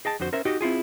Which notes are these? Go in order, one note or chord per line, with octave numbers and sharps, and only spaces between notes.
G#4 D#5 G5 A5
F2 D3 F#4 C5
C#4 A#4 C5 E5
D#4 F#4 G4 D#5
C4 E4 F4 G#4